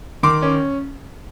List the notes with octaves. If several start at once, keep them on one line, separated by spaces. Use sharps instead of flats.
D#3 C6 D6
C#4